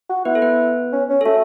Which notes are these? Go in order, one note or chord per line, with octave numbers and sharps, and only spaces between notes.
F#4
B3 E4 B4
A4
B3 B4
C#4
C#4
A4
A3 F#4